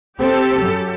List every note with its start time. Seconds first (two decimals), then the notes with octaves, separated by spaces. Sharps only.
0.20 C4 G4 A4
0.60 F#2